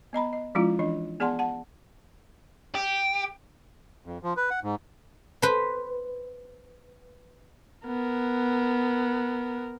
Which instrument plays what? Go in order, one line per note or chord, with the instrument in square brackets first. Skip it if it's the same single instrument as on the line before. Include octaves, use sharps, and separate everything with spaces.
[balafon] B3 D#5 A#5 B5
D#5
F3 G#3 C#4 E4 F4
E3 D4 D#5
B3 G#4 D5 F#5 A5 C6
F#5 A5
[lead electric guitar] G4
[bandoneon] F2
F3
B4
F#5
G#2
[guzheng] B4 C5
[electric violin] B3 A#4